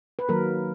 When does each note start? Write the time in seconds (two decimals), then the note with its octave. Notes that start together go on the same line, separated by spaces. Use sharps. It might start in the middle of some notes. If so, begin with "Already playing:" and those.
0.19 B4
0.28 D#3 F#3 A#3 A#4